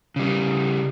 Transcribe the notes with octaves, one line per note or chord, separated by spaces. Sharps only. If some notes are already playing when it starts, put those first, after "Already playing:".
C#3 G3